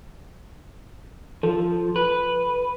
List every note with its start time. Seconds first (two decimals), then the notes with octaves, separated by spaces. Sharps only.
1.43 F3 A4
1.96 B4